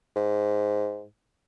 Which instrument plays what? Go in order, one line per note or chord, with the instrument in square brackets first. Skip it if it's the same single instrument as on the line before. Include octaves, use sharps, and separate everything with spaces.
[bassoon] G#2